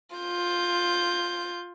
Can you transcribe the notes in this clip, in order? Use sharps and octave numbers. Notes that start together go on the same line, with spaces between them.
F4 G6